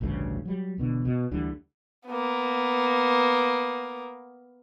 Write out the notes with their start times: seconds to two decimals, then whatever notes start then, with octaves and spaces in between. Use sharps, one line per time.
0.01 A1 D2 G2 C#3
0.45 F#3 G3
0.78 E1 B2 D3
1.05 B2
1.31 D2 D3 E3 G3
2.07 A#3 B3